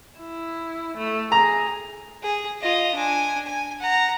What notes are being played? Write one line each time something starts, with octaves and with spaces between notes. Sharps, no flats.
E4
A3
G#4 A#5
G#4
F4 D#5
D4 G#5
G#5
F#5 A#5